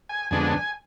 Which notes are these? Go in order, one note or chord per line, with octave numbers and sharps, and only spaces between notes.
G#5
F2 D3 G#3 B3 D4 G#5
G#5